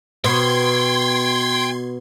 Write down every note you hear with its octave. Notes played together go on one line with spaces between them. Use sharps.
B2 G5 C6 G#6